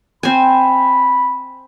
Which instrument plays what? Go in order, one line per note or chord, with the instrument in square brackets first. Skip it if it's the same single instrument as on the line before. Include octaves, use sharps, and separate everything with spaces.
[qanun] C4 G#5 [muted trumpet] B5